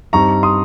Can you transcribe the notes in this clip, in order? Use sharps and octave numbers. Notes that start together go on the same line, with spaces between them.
G2 G3 C4 D#4 A#5 C#6
C6 D#6